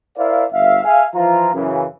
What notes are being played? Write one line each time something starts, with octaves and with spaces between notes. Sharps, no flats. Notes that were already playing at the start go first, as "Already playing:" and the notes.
E4 A#4 C5 D5 E5 F5
G1 E5 F5
G#4 E5 F5 G#5
E3 F3 F4 A#5
F#2 C#3 E3